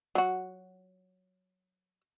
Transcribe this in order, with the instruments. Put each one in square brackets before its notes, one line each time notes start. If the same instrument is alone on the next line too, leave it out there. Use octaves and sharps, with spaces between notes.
[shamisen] F#3 F#4